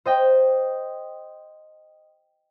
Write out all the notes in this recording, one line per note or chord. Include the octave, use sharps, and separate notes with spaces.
C5 D#5 G5